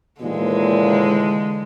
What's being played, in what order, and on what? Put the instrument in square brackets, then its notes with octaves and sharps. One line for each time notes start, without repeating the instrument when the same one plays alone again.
[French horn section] D#2 A#2 E3 [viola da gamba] D3 G#3